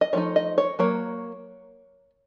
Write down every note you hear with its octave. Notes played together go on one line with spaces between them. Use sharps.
D#5
F3 A3 D#4 C#5
D#5
C#5
F#3 A#3 C#5